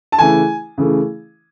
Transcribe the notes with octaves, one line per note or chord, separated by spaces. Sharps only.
A5
C#3 E3 A3 G#5
C#3 E3 A3